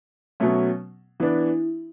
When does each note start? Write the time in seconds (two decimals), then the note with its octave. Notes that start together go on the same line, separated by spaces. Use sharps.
0.40 B2 F#3 A3 C#4
1.20 E3 B3 D4 E4